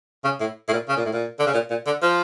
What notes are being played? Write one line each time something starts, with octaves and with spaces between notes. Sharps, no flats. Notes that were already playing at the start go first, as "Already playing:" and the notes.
C#3
A2
A2
A#2
C#3
A#2
A2
A#2
D3
C#3
A#2
A#2
D3
F3